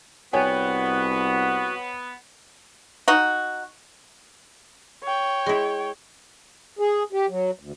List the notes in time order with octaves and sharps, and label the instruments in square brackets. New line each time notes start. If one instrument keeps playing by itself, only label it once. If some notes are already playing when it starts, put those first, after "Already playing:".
[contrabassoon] C2 [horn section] B3 [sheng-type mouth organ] F#4 [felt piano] C#5 G5 G#5
[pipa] D#4 F#4
[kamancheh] C#5 G5
[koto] G#3 E4
[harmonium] G#4
G4
F#3
D2